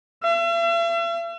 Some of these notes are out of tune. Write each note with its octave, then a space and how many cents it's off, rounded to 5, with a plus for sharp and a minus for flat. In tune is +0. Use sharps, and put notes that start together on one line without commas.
E5 +45